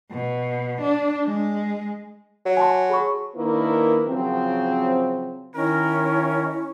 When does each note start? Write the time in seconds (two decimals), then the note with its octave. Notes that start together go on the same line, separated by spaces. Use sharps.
0.11 B2
0.81 D4
1.26 G#3
2.45 F#3
2.57 G#5 A5 C6
2.89 G#4 B5 C#6
3.36 D#3 A#3 D4 E4 A#4 B4
4.07 C#3 F3 F#3 C4
5.55 D#3 C#4 E4 A#4